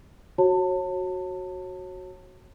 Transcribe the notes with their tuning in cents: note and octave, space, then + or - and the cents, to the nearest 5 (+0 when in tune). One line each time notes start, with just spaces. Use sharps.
F#4 +0 C#5 -30 A5 +30